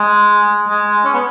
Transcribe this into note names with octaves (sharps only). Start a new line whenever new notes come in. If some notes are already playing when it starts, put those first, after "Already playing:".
Already playing: G#3
G#3
C#4
B3